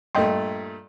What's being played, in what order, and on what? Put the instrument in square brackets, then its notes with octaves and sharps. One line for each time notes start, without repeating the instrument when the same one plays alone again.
[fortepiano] G2 A#2 A3 [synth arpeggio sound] D#5 G5 C6